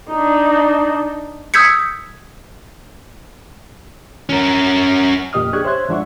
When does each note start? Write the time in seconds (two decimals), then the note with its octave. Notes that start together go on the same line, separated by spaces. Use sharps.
0.10 D4 D#4
1.54 D#6 E6 G6 G#6 B6 C#7
4.29 C#4 A#4
5.33 F2 A#2 G4 D#5 D#6 F6
5.53 D4 G4 G#4 C#6 F#6 G#6
5.65 C5 C#5 E5 C6 F#6 G#6
5.89 G#2 F3 D4 E5 F#5 C#6